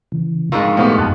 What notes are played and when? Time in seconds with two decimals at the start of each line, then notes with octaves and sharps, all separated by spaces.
0.12 C#3 E3
0.52 F2 G#2 G#3 F4 A#4 C#6 E6
0.77 A#2 A3 B3 G4
0.98 F#2 A5 F#6